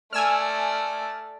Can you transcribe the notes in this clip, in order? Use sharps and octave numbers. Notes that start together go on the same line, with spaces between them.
A3 D5 G#5 E6 F6